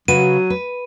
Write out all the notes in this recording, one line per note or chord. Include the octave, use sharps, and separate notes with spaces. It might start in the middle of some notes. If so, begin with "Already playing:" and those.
C#3 F#3 F#4 B4 D#7
B4